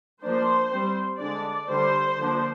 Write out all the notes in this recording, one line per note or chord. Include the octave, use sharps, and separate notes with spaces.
F3 A#3 D4 C5
G3 C4
D3 G#3 D4 D5
D3 G3 D4 C5
D3 F3 A#3 D4